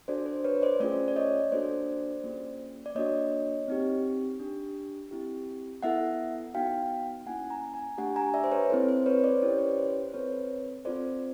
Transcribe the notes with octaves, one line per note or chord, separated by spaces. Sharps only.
D4 F#4 A4 C5 D5
C5
B4 C#5
C5 D5
A3 C#4 F4 G#4 C5 D5
D5
C#5 D#5
A#3 D4 F#4 A4 C5 D5
A#3 C#4 F4 G#4
D5
A#3 D4 F#4 C#5 D#5
C4 D#4 G4
D4 G4
C4 E4 G4
B3 E4 A4 E5 F#5
B3 D#4 F#4 F5 G5
A#3 C#4 E4 F#5 G#5
G#5 A#5
G#5 A#5
A3 D4 G4 F#5 G#5
G#5 A#5
D5 E5
C5
B4 C#5
C4 E4 A4 C5
C5
B4 C#5
C5 D5
C#4 E4 G4 C#5
D5
B4 C#5
C5
C5
C4 F4 A4 B4 C#5
C4 F4 A4 C5 D5